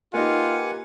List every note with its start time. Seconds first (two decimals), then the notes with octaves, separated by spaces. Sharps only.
0.14 A#3 D#4 F4 G4 B4 F#5 G#5